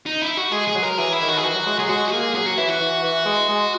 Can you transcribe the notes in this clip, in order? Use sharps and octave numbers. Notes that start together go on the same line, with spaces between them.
D#4
E4
F#4
G#3 G#4
G#4
F#3
A#4
E3 G#4
E4
D#3
F#4
G#4
E3 F#4
F#3
G#3
F#3 G#4
G#3 F#4
F#4
A#3 G#4
F#3 G#4
F#4
E3 E4
F#4
E3
E3
G#3
G#3